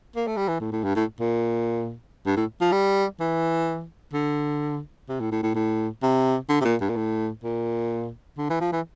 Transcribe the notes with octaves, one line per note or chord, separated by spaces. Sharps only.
A#3
A3
G3
E3
A2
A2
G2
A2
A#2
G2
A2
F3
G3
E3
D3
C3
A2
A2
A2
A2
C3
D3
C3
A#2
G2
A#2
A2
A#2
D3
E3
F3
E3